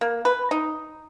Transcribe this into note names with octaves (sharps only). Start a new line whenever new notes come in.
A#3
B4
D#4